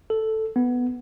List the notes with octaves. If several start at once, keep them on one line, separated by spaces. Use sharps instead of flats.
A4
B3